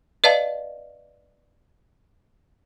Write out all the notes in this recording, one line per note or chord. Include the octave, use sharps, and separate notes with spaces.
B4 D5 D#5 F5 A5